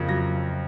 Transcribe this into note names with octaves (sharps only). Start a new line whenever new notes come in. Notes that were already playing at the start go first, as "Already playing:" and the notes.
Already playing: F2 C#3 A#3
F#3 A#6